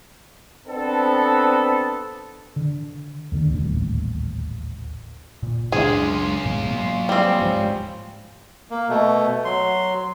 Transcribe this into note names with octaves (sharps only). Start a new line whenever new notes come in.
B3 C4 D4 A4
D3
D#2 D3
D#1 A1 D2
A#2
C#2 F#2 C#4 D4 F4 G#4
G#2 B2 F#3
F#3 A#3
G3 C4
D2 G#2 F3
A#3
B2 A3
F#3 C6